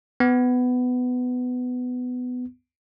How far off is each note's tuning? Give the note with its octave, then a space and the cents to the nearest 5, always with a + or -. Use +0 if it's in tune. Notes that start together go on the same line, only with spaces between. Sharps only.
B3 +15